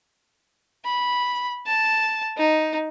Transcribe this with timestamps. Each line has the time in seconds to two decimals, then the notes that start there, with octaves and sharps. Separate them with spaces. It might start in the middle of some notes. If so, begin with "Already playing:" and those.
0.85 B5
1.67 A5
2.38 D#4